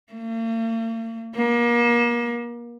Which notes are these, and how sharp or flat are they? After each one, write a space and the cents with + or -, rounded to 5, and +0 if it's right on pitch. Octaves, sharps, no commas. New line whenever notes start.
A#3 -45
A#3 +35